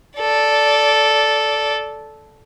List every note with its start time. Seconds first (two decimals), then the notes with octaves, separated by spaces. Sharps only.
0.18 A4 D5